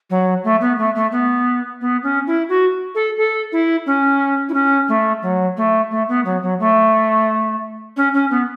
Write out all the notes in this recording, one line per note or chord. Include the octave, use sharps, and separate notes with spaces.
F#3
A3
B3
A3
A3
B3
B3
C#4
E4
F#4
A4
A4
E4
C#4
E4
C#4
A3
F#3
A3
A3
B3
F#3
F#3
A3
C#4
C#4
B3